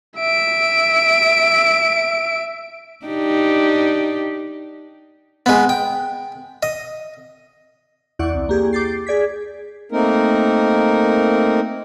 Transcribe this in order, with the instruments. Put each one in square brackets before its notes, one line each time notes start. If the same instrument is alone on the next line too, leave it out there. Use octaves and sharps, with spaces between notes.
[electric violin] E5 D7
[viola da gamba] D4 D#4 G4
[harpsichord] G#3 B3
G5
D#5
[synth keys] E2 E4 D5 F#5 C#6
C2
A#3 G4 G#4
D6 G6 A6 C7
G#4 D5 G#6 B6
[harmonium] A3 A#3 C4 D#4 A#4